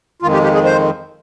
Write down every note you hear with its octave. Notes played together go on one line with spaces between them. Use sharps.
F2 D#3 G#3 F4
G4
G4
G#4
C5